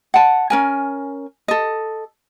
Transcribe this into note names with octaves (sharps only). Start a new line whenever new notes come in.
F#5 A5
C#4 A#4 G#5
A4 D#5